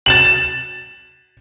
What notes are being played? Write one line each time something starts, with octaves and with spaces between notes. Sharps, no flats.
A6 E7 F#7